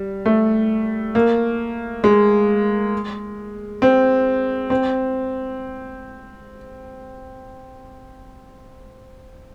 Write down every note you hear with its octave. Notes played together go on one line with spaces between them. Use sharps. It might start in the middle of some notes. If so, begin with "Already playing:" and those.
Already playing: G3
A3
A#3
G#3
C4
C4